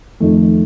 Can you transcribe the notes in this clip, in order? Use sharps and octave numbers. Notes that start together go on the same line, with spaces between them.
F2 D#3 A3